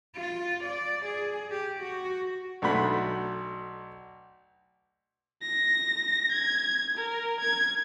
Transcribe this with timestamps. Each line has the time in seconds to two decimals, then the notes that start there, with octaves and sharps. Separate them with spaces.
0.15 F4
0.64 D5
1.05 G#4
1.51 G4
1.80 F#4
2.62 B1 A3 D4 F#4 B5
5.43 A#6
6.33 G#6
6.98 A#4
7.41 G#6